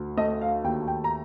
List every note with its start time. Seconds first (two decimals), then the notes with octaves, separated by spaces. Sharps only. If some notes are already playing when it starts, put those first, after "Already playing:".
Already playing: D2
0.17 A3 D#5
0.41 F5
0.64 D#2 G5
0.88 G5
1.04 A#5